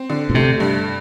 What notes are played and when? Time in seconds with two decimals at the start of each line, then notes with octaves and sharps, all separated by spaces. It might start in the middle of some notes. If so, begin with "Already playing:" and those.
Already playing: C4
0.10 D3
0.30 A#2
0.34 C3 A3
0.60 G2